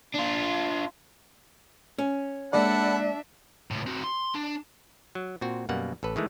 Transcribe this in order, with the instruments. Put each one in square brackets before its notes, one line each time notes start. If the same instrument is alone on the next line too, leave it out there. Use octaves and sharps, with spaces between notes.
[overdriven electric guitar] D4 F4
[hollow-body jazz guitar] C#4
[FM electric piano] G#3 A#3 D5 [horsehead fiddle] D4 E5 [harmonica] A4 F#5 B5
[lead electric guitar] C#2 A2
C4 F#4
C6
D4
[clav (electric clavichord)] F#3
A#2 C4 F#4
F#2 B2 G3 A#3 F#5
A1 A4 B4
D#3 E3 G#3 A3